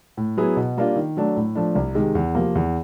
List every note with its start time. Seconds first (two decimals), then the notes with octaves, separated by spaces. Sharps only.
0.17 A2
0.37 F#3 B3 E4 G#4
0.56 B2
0.77 G3 A#3 D4 F4
0.96 D#3
1.17 F#3 A3 D4
1.37 A2
1.55 F3 A3 D4
1.75 C2
1.95 C3 D#3 G#3
2.15 E2
2.35 C3 F3 A#3
2.55 E2